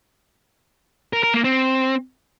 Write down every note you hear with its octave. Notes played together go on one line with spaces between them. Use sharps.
A#4
A#4
A#3
C4